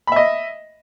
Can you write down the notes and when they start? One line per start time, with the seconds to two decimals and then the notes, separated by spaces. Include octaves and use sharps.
0.07 B5
0.12 E5
0.16 D#5